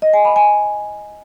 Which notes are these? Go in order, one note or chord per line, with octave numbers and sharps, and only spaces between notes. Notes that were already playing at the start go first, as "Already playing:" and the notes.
D#5
G#5
B5
G#5